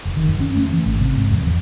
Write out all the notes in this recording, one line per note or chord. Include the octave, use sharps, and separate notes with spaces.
F1
D#3
F#2
C#4
A3
E3
G#1
C3
G#2
F2
E2